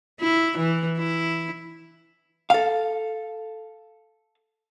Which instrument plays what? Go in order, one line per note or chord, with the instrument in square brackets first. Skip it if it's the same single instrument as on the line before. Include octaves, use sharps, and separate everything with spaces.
[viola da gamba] E4
E3
E4
[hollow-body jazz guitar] A4 F5